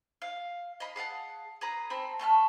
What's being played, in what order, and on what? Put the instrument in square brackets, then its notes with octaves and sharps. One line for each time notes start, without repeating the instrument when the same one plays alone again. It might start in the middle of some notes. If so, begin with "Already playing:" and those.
[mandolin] F5
D#5 F5 B5
G#4 F5 F#5 A5
G#4 B4 A#5
C4 A4 B5
A3 A4 A5 F6